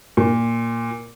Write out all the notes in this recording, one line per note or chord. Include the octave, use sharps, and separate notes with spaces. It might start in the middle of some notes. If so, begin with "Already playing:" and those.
A#2